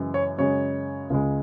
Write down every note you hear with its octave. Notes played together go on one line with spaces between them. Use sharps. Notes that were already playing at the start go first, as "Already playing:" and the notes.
Already playing: F#2 C#3 E3 G#3
C#5
F#2 C#3 G#3 C#5
C#2 C#3 G#3